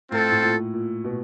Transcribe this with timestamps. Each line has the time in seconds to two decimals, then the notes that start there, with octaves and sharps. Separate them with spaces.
0.11 A2 C4 F4 A4
0.32 A2
0.43 A#2
0.74 A#2
1.04 B2